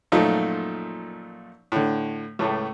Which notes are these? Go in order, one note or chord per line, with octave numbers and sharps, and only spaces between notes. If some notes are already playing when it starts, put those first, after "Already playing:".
F#2 A#2 F3 A3 D#4 F4
A2 D3
C#2 A2 A3